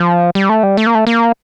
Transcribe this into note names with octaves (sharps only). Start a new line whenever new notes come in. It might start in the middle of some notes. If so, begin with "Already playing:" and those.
Already playing: F3
G3
A3
G3
A3
A#3
A3
A#3